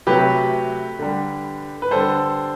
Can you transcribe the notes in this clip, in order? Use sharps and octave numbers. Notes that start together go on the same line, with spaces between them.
C3 F#3 A3 G4 B4
D3 G3
B4
D3 G3 A4 C5